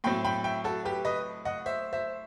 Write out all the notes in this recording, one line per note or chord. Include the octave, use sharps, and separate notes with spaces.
A2 F#3 C4 G5 B5
G5 B5
E5 G5
F#4 A4
G4 B4
B4 D#5
D#5 F#5
C5 E5
C5 E5